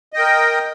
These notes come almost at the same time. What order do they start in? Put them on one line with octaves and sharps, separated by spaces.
D#5 G5 A#4